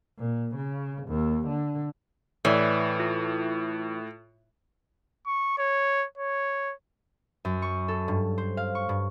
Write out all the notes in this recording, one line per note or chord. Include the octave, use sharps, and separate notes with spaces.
A#2
C#3
D#2
D3
A2 E3 C#5 D5
F4
C#6
C#5
C#5
F#2
C#6
A4
G2
C5
F5
C#6
G2